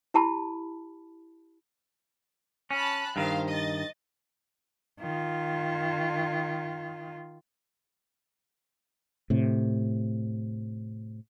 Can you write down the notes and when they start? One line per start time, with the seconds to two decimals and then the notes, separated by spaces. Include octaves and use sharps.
0.14 E4 G4 A5 B5
2.71 C#4 A5 B5 F#6
3.16 G2 D#3 C5 F5
3.48 D#5 A6
5.00 D#3 F4
9.30 A2 C3